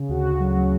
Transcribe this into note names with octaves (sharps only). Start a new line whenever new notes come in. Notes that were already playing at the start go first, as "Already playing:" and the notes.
Already playing: C#3
D2 F#4
C#3
F#3
F#3